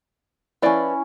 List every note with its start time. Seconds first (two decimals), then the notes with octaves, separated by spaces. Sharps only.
0.62 F3 C#4 E4 B4 D5